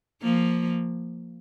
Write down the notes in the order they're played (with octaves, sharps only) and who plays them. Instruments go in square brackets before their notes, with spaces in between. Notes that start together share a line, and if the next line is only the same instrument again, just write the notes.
[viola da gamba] F3 A#3